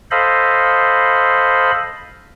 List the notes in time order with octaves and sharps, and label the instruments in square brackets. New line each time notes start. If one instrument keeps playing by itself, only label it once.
[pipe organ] A4 C5 D#5 F5 B5